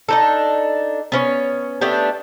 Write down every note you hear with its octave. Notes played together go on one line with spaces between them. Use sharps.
D4 D#4 A4
B3 C#4 C#5
A3 B3 D4 G4